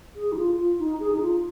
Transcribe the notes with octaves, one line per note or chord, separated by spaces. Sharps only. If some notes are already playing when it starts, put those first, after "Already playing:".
G#4
D#4
F4
F4
D#4
G#4
D#4
F4